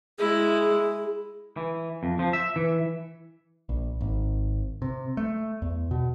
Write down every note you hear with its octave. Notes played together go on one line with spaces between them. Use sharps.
G#3 E4 G#4
E3
F2
F3
E5
E3
A#1
G#1
C3
A3
E2
B2